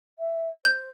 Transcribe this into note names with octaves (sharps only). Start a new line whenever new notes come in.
E5
C5 G6